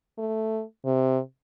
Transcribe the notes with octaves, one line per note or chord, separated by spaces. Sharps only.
A3
C3